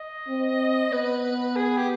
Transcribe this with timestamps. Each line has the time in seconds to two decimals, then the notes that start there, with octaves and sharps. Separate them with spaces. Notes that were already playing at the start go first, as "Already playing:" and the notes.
Already playing: D#5
0.28 C4
0.92 B3 B4
1.56 G#4
1.77 G4